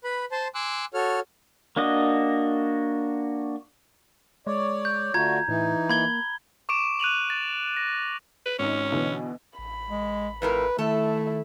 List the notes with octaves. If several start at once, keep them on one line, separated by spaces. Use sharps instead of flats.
B4 B5
C5 A5 C6
G#5 C6 D6 E6 F#6
F#4 A4 C#5 F6
A#3 D4 F#4 D#5
G#3 C#5 D5
G6
D3 A3 F4 F#4 A#5 G#6
A2 E3 D#4
A#3 B5 G#6 G7
C#6 D6 D7 E7
F#6 D#7 F7 F#7
A6
A#6
B4
G#1 C#4 D#4
B2 D3 E3
A1 B5
G#3
F2 A2 A#4 B4
D#3 A3 E4 A4 E5